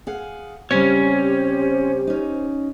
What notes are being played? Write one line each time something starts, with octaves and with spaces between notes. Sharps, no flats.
G#4 F5 F#5
C#3 G3 C4 C#4 G4 C5 C#5
C#4 D#4